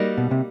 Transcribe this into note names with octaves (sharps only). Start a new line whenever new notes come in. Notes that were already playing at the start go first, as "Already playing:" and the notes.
Already playing: G3 A#3 D#4 F#4 A#4
B2
C3